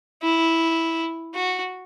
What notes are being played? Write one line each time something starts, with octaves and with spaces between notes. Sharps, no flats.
E4
F#4